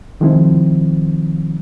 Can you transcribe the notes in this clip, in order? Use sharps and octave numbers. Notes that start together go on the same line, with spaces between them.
C3 D#3 F3 G#3 C4 E4